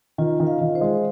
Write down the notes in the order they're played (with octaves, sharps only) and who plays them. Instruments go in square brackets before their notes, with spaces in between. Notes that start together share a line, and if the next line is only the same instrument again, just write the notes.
[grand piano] D#3 [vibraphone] F4
[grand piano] D#3
[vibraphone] F5
[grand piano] D#3
[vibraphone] C5
[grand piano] G#3